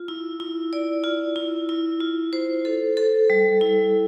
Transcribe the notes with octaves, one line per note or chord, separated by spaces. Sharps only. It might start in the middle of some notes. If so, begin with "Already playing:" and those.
Already playing: F4
E4
E4
D5
F4
E4
E4
F4
C5
A4
A4
G3
E4